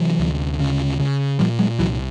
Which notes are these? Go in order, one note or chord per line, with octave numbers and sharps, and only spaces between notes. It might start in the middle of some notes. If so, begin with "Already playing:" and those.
Already playing: C3 E3 F#3
D2
C#3
C#3
A#2 F3 G3
F#3 G#3
C2 E3 F#3